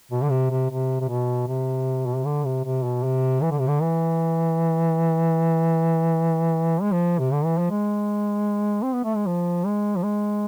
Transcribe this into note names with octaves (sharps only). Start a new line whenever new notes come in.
B2
D3
C3
C3
C3
C3
B2
C3
B2
C3
D3
C3
C3
B2
C3
E3
D3
C3
D3
E3
G#3
F3
C3
D3
E3
F3
G#3
C4
B3
A3
G#3
F3
G#3
F3
G#3